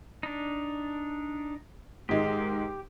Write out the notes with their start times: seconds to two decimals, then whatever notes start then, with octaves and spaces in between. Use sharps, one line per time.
0.23 D4 D#4
2.09 G#2 D#3 G#3 G4